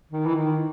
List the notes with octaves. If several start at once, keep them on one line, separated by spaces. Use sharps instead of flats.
D#3
E3
D#3